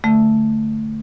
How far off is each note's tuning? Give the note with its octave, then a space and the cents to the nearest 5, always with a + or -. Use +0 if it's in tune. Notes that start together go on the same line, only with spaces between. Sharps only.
D3 +0 A3 +0